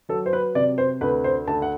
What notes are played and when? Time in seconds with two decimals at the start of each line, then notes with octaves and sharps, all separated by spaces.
0.09 F#3 A4
0.26 C5
0.33 B4
0.55 C3 D5
0.78 C5
1.01 D2 B4
1.24 C5
1.47 D2 A5
1.62 F#5